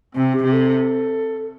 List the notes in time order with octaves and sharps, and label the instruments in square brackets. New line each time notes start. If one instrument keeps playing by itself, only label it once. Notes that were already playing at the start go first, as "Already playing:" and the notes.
[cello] C3 [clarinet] C4
[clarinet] G4
[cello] C3
[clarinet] A4